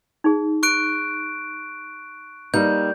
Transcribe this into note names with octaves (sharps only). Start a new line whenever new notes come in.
D#4 G#4
C#6 F#6 D7
G3 A#3 D#4 B4 G6